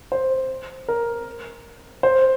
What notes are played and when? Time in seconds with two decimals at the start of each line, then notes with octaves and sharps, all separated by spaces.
0.12 C5
0.88 A#4
2.03 C5